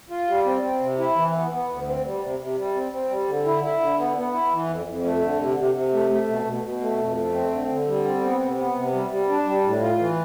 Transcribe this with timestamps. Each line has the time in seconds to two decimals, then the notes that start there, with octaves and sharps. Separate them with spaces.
0.10 F4
0.27 G3
0.45 C4
0.62 C4
0.80 C3
0.98 E4
1.15 E3
1.33 B3
1.51 B3
1.69 D2
1.86 C4
2.04 G3
2.21 C3
2.39 C3
2.57 G3
2.75 C4
2.92 C4
3.09 G3
3.28 D3
3.45 E4
3.63 E4
3.80 D3
3.98 B3
4.16 B3
4.33 E4
4.51 E3
4.69 F2
4.87 F2
5.04 A3
5.21 D3
5.40 C3
5.57 C3
5.74 C3
5.93 A3
6.10 A3
6.28 B2
6.45 B2
6.63 B2
6.81 A3
6.98 F2
7.17 A3
7.33 C4
7.51 D3
7.69 D3
7.87 G3
8.05 C4
8.21 B3
8.39 C3
8.57 B3
8.75 C3
8.93 G3
9.10 G3
9.28 D4
9.46 G3
9.64 A2
9.81 F4
9.99 E3